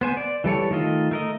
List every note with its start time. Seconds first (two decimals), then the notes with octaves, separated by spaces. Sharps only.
0.01 B3 C5 G#5
0.17 D5
0.44 E3 G3 A4 C#5
0.71 D#3 A3 F4 D#5
1.11 A3 A#4 D#5